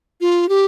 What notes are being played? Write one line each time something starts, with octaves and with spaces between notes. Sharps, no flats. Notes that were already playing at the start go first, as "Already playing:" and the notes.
F4
G4